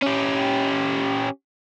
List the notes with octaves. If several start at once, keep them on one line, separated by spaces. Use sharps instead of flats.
C#4 G4